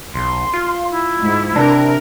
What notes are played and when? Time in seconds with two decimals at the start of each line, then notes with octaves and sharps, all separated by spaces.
0.14 B1 C6
0.53 F4
0.90 E4
1.22 G#2
1.56 C3 D4 A#4